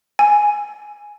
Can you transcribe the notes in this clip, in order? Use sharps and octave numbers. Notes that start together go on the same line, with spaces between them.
G#5